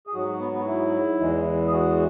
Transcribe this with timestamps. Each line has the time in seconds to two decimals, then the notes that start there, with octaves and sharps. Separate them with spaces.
0.07 G#4
0.13 G#2 F#3 F#4
0.27 F#4
0.39 B3
0.53 B3
0.60 F#4
0.66 E4
1.19 E2 E3 G#3
1.68 G#4
1.73 F#4